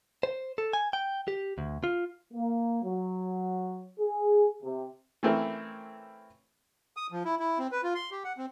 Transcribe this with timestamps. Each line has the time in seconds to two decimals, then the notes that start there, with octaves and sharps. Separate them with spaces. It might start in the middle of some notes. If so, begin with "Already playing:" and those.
0.23 C5
0.58 A4
0.73 G#5
0.93 G5
1.28 G4
1.58 D2
1.84 F4
2.33 A#3
2.83 F#3
3.98 G#4
4.62 C3
5.23 E3 A3 C4 C#4 E4 A#4
6.97 D#6
7.12 F3
7.25 E4
7.40 E4
7.58 C4
7.72 B4
7.83 F4
7.95 C6
8.11 G4
8.24 F#5
8.38 C4